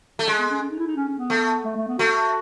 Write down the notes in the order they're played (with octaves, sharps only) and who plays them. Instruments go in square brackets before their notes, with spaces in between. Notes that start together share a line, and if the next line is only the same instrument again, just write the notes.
[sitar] A3
G#3
[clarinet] B3
C#4
C#4
D#4
E4
D#4
C#4
C#4
B3
[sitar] A3
[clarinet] A3
A3
B3
[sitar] A3 [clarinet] F#4